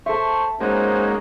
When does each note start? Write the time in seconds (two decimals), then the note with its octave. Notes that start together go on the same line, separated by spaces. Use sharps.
0.06 A4 C5 E5 C#6
0.60 G#3 A#3 C#4 D#4 F#4 C5